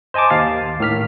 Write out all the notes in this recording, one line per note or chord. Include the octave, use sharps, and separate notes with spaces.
C5 D#5 G#5 A5 D6
D#2 F5 A6 C7
A2 D#3 F6 B6